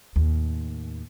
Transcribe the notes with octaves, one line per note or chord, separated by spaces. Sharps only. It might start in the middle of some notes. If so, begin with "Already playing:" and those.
D#2 A2